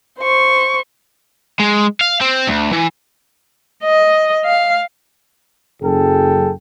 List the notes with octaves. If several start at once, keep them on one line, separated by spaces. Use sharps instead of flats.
C5 C#6
G#3
F5
C4
D2
E3
D#5
F5
F#1 F#2 G#4 A4 G5